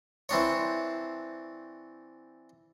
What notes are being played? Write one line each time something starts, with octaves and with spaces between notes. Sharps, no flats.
E3 C4 D4 C#5